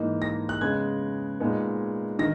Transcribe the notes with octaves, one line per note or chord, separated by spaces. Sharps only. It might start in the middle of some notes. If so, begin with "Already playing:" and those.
Already playing: G#2 E3 A#3 D#4
A#6
F#6
C#3 G#3 B3 G#6
A#2 G#3 B3 D#4
D#3 A#6